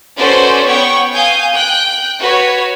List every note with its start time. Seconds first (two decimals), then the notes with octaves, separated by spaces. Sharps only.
0.17 C#4 F#4 A4 B4 C5 D5
0.66 B3 C#5 F#5 G5 C#6
1.12 F5 G#5 D#6 G6
1.54 G5 F#6
2.19 F#4 B4 C#5